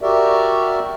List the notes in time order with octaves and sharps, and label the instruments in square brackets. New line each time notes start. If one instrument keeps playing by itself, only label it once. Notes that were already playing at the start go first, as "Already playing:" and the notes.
[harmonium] F#4 G4 A#4 D5 E5